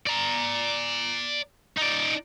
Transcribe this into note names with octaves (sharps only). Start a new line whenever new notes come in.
D5 A#5
D#4 D5